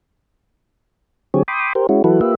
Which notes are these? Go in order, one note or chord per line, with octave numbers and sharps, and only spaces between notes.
D3 F#3 C4 G4 G#4 C#5
G5 B5 C6 D6 D#6
G4 A#4 C5
G#3 C#4 E4 F#4
E3 F#3 E4 F#4 A4 B4
A#3 F4 G4 B4 E5